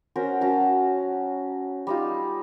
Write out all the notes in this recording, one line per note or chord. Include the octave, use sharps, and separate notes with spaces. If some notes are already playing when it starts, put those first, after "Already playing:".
C#4 F#4 A#4 C5
F#3 C#4 A5 A#5
G3 D#4 F4